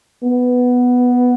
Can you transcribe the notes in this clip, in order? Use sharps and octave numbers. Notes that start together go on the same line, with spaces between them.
B3